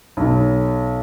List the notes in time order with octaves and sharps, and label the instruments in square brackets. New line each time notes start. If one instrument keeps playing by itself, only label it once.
[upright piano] B1